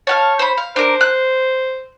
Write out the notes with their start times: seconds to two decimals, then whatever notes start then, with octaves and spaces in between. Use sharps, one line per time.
0.07 C#5 F5 F#5 A5
0.39 C5 B5
0.57 F5
0.76 D4 A#4 C5
1.01 F#6